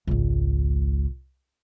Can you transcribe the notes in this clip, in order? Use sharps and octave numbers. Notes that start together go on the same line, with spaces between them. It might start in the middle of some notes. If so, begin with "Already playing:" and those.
G#1 C#2